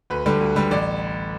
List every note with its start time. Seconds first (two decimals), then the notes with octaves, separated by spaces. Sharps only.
0.10 D2 B4
0.26 D3 G3
0.41 D2
0.56 D3 G3
0.71 A1 D5